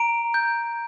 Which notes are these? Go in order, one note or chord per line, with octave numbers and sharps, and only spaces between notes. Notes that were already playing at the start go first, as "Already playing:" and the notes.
Already playing: A#5 D7
G6